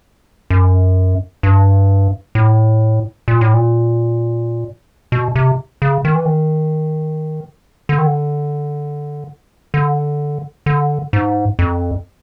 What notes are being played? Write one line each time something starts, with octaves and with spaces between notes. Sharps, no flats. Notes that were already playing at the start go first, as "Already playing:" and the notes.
F#2
G2
A2
A#2
A2
A#2
B2
C3
C#3
D#3
E3
D#3
D3
D#3
D3
D3
D3
G#2
F2